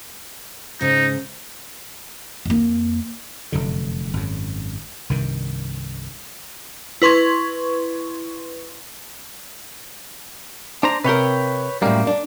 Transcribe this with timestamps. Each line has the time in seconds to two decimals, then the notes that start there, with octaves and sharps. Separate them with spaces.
0.81 G#2 C#3 D#4
2.45 F2 A#3
3.52 F1 F#2 D3
4.13 G#1 F#2
5.09 C2 G2 D#3
7.02 E4 B4 C6 C#6 G#6
10.83 D4 C5 A#5
11.04 C3 A#4 B4 C#5 G5
11.82 F#2 A2 G3 A#3
12.07 D4